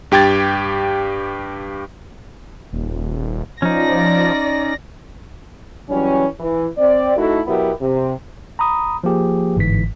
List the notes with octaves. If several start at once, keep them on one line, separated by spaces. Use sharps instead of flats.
G2 G4 G5 G#6 A6
D#1
F3 C#4 D#4 D5 A#6
E3 F#3 G3 C#4
E3
C4 D5
A3 D#4 E4 F#4 A4
B2 F#3 B3 E4 G4 A#4
C3
A#5 B5 D#6
F3 A#3 G4 G#4
G1 G#2 E3 B6